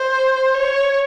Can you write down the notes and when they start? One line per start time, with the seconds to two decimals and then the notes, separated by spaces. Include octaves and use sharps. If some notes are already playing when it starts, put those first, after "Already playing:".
Already playing: C5
0.54 C#5